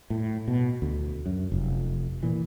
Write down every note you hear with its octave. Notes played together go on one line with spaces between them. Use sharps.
A2
B2
D2
F#2
F1
A#2 E3